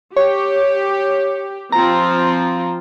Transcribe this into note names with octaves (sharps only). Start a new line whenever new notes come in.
G4 C#5
F3 C4 F4 A#5